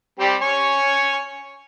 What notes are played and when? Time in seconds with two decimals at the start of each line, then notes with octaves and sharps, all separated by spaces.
0.19 G3 C4 G4
0.42 C#5 G#5 C#6